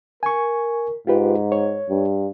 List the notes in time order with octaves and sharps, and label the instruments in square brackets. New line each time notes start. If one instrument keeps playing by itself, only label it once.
[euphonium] A#4 [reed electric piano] G#5 C#6
[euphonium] G#2 [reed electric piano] F4 G4 B4
[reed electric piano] C#5
[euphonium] G2